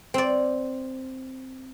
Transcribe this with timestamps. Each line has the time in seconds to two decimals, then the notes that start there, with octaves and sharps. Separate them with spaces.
0.14 C4 D5